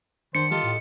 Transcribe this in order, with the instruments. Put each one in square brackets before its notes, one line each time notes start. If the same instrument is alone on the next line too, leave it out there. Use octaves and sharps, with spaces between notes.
[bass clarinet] D#3 [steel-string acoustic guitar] D4 [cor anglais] C5 [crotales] C#7
[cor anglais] F4 [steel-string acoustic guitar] G4 A4 D#5
[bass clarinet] A2